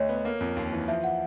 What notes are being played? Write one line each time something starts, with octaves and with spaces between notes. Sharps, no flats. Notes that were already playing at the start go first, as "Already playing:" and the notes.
Already playing: D2 C#5 D#5
B3
A#3
F2
D#2
E3
F3 E5
F#5